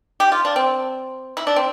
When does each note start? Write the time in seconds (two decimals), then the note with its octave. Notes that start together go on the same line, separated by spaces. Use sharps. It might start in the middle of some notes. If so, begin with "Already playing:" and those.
0.20 G4
0.32 F4
0.45 D4
0.56 C4
1.37 E4
1.47 D4
1.56 C4